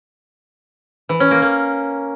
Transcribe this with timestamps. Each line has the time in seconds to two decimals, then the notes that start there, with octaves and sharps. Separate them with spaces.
1.09 E3
1.20 C#4
1.31 A#3
1.42 A#3